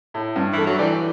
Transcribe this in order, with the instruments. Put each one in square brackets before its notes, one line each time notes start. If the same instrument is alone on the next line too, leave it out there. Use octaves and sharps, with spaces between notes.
[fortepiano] A2
G2
[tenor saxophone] E3 [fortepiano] A3
[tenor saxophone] F#3
[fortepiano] E3 [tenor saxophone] G3